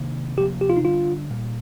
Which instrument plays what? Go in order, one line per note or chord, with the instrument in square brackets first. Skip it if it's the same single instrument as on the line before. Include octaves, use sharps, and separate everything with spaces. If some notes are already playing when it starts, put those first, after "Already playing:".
Already playing: [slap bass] C3 D#3 A#3 D4
[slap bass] C3 F3 A#3 [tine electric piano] G4
[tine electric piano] G4
F4
D#4
[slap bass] D3 G3 D4 [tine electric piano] F4
[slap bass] A#2 G3 A#3